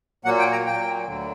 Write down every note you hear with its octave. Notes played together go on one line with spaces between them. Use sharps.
A#2 F#3 A#3 F#5
G5
A#5
A#2 F#3 A#3 G5
D2 D3 F#3